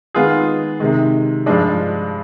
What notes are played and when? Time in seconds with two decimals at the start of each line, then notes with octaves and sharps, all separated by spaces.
0.15 D#3 G#3 B3 F4 G#4
0.80 C3 D#3 G#3
1.46 G2 F3 G#3 D4